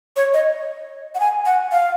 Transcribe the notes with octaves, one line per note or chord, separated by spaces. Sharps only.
C#5
D#5
F#5
G#5
F#5
F5